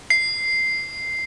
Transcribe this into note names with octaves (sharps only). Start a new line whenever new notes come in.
C7